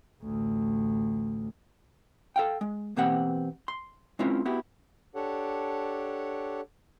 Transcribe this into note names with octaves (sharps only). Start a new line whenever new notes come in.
A1 D2
A4 F5 G5
G#3
B2 E3 A#3 C4 G4 F#5
C6
G#3 C4 C#4 E4 F4 A#4
B3 E4 F#4 G4
D4 G4 A4 C#5 F#5